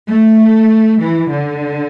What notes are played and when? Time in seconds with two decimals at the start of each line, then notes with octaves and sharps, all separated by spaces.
0.09 A3
1.01 E3
1.31 D3